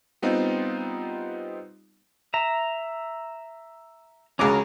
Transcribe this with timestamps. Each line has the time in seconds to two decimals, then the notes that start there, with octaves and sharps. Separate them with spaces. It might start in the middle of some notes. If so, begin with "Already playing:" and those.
0.22 G3 B3 C4 D#4 F4
2.34 E5 A#5
4.39 C#2 G#3 C#4 F#4 A#4 D6